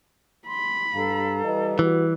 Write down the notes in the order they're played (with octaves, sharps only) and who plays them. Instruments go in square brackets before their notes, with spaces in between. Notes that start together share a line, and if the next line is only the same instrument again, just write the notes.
[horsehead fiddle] B5 [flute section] C6
[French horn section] G2 [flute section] A4 F5 A#5
[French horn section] E3 B4 D#5 [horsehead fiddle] G3
[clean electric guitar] E3 [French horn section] F#4 B4